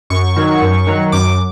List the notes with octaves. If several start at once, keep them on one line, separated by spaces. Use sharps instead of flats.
F#2 C#6
D#3 F#3
F#2
D#3 F#3
F#2 D6